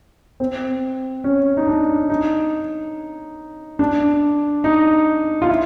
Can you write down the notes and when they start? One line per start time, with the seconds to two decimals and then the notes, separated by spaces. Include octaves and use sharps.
0.40 C4
1.24 C#4
1.57 D#4
1.67 D4
2.10 D#4
3.79 D4
4.64 D#4
5.42 F4
5.49 E4